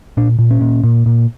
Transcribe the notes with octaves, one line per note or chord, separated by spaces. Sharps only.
A#2 D4
A#2
C#4
A#2
A#2
A#2